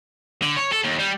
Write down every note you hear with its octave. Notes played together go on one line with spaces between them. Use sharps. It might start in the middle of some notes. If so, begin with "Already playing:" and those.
D3
C#5
A4
D#2
G3